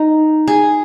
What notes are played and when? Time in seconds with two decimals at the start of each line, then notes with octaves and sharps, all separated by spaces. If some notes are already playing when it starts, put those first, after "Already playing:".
Already playing: D#4
0.48 G#4